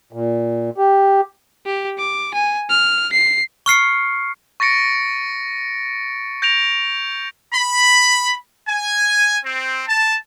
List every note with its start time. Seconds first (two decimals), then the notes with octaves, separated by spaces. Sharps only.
0.13 A#2
0.78 G4
1.66 G4
1.98 D6
2.34 G#5
2.70 F6
3.13 C7
3.66 C#6 F6 C7 C#7
4.60 C#6 A6 A#6 C#7 D7
6.42 G6 A#6 D7 F7
7.53 B5
8.68 G#5
9.44 C4
9.87 A5